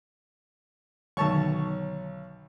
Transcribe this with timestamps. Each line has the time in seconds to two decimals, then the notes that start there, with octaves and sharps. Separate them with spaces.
1.17 B1 D3 D#3 C#5 A5 C#6